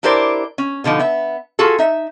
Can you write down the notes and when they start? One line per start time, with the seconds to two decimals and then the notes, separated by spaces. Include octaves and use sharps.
0.03 D4 E4 G4 A#4 C5 D5
0.58 C#4
0.84 B2 D3 F3 D#4
1.00 B3 E5
1.59 F4 F#4 G#4 A4
1.78 D#4 E5